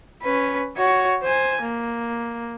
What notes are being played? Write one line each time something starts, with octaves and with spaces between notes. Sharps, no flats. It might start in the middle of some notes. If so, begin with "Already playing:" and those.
C#4 B4
F#4 C#5
C5 G#5
A#3